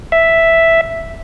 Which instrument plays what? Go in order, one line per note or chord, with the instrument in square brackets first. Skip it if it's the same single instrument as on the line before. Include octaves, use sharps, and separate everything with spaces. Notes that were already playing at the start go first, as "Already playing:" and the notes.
[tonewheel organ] E5